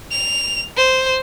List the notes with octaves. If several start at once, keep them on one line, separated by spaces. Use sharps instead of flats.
F7
C5